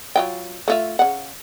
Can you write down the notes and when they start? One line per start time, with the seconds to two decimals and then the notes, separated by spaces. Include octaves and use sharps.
0.16 F#3 F4 G5
0.68 A3 F4 E5
0.99 C#3 F#5